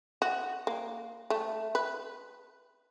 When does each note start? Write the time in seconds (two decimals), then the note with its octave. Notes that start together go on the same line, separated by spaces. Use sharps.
0.22 F#4
0.67 A#3
1.30 A3
1.75 B4